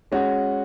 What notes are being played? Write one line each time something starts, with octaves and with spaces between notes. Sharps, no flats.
G#3 C#4 F#4